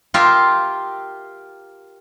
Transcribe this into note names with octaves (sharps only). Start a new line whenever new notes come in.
F4 G4 A#4 E5 F5